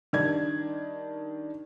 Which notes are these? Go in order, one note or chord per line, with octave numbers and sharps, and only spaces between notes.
D#3 G3 D4 D5 G#6